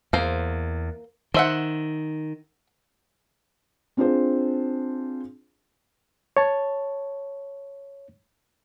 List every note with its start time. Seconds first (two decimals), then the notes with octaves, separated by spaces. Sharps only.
0.13 E2 A#3 C5
1.34 D#3 C5 E5 F#5
3.97 C4 D4 F4 G#4 C5
6.37 C#5 A5